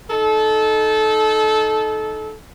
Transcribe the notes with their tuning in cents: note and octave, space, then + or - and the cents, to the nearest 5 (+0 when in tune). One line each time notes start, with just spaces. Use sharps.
D#4 +0 A4 -20